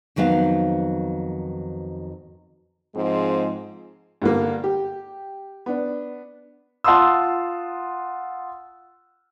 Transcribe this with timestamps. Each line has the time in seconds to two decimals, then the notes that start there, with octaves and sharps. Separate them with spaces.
0.16 F2 D#3 F#3 B3 F5
2.94 G#2 F3 G#3 C4
4.22 G2 D3 A#3
4.64 G4
5.66 B3 D4
6.84 F4 F#5 A5 C6 D#6 E6